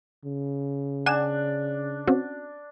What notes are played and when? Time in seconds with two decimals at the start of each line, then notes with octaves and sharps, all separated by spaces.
0.25 C#3
1.06 D4 F#5 G#5 E7
2.07 C4 C#4 F#4